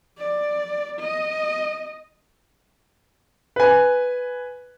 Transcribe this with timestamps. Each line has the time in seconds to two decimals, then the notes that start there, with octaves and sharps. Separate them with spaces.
0.18 D5
1.00 D#5
3.56 B4 G#5